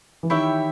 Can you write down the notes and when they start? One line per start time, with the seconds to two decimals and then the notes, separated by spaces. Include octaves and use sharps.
0.23 E3
0.30 D#3 E4 G4 C#5 E5